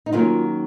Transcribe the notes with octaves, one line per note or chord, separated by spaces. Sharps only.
D#4
D#3 F#3 A#3 C#4 F4